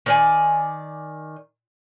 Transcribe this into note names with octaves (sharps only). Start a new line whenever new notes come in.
D#3 D5 G#5